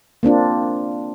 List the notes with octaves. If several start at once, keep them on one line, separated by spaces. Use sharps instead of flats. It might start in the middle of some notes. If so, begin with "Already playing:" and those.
A#3 C4 D4 F4